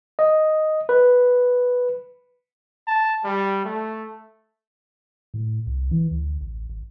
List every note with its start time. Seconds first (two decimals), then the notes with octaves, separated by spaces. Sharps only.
0.19 D#5
0.89 B4
2.87 A5
3.25 G3
3.65 A3
5.34 A2
5.67 C2
5.91 E3
6.11 D2
6.41 A1
6.69 G#1